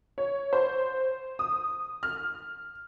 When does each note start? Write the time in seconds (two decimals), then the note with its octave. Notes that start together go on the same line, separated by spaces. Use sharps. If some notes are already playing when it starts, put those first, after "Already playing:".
0.18 C#5
0.53 C5
1.39 D#6
2.03 F6